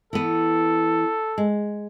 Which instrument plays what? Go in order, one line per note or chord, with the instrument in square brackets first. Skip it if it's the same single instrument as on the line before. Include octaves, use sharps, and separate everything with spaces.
[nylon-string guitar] E3 B3 [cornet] A4
[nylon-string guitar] G#3